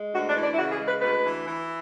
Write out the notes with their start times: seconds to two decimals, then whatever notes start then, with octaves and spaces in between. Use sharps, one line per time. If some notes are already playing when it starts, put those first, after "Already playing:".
Already playing: G#3
0.13 D2 F#4
0.28 D4
0.35 E3
0.43 D4
0.53 E4
0.58 C#3 F#4
0.72 G#4
0.80 G#3
0.87 B4
1.02 D2 B4
1.25 E3
1.46 E3